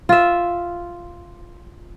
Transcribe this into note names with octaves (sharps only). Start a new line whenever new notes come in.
F4 E5